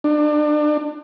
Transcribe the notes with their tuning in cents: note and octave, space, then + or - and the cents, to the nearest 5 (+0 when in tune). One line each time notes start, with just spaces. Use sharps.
D4 +30